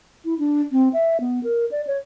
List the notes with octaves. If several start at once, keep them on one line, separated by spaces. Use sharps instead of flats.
E4
D4
C4
E5
B3
A#4
D5
C#5